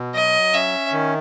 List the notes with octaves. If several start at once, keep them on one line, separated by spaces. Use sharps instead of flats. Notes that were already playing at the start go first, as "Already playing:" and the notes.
Already playing: B2
F#3 D#5
C#4 E5
D#3